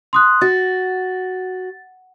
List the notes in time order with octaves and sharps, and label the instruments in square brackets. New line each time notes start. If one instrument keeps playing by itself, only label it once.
[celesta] C6 D#6 F#6
[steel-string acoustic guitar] F#4 [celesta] A6